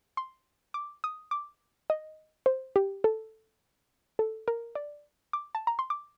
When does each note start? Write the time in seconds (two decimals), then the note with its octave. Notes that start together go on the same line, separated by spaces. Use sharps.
0.17 C6
0.74 D6
1.04 D#6
1.31 D6
1.90 D#5
2.46 C5
2.76 G4
3.04 A4
4.19 A4
4.48 A#4
4.75 D5
5.33 D6
5.55 A5
5.67 A#5
5.79 C6
5.90 D6